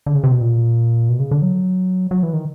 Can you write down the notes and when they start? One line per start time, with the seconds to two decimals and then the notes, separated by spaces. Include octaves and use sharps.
0.06 D3
0.15 C#3
0.24 C3
0.32 B2
0.41 A#2
1.09 B2
1.20 C#3
1.31 D3
1.42 F#3
2.11 F#3
2.23 E3
2.33 D#3